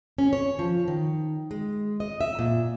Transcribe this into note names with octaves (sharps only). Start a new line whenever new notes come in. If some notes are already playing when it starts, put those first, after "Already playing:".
C#4
C#5
F3
D#3
G#3
D#5
E5
A#2